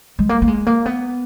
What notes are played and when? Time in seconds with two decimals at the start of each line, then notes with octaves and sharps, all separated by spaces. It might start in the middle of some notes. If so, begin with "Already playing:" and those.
0.19 G#3
0.29 A#3
0.42 A#3
0.48 G#3
0.67 A#3
0.86 B3